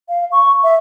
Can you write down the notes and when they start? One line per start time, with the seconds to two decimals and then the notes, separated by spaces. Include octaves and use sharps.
0.09 F5
0.32 C#6
0.64 E5